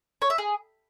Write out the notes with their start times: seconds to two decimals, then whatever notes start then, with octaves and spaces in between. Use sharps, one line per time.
0.22 C#5
0.30 E5
0.38 G#4